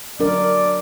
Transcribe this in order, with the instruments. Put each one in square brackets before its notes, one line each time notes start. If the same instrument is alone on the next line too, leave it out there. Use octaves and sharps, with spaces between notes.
[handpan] F#3 D4 A#4 [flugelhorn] D5